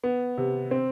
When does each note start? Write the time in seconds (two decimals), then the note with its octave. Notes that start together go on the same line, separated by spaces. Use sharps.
0.04 B3
0.38 C3
0.71 C4